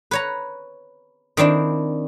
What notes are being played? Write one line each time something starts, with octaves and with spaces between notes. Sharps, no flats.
B4 C#5 A#5
D#3 C4 D4 E4